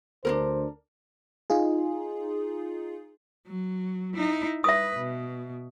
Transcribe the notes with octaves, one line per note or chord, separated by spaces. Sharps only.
D2 D4 D#4 A#4 C5
D#4 F4 G#4
F#3
D#4 E4
B4 E5 D#6
B2